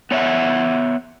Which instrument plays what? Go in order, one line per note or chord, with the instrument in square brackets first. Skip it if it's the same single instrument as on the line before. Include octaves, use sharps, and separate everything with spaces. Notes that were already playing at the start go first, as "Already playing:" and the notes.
[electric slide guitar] B3 C#5 D#5 E5 F#5